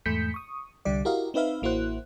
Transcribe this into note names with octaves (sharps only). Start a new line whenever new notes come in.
E2 G#2 A3 G6 B6 C#7
C#6 D#6
C2 D3 G3 D5
E4 F#4 G4 A#4 D#5 F5
C4 D#4 B4 E5 F5
A1 A#3 E4 F#4 C5 F#6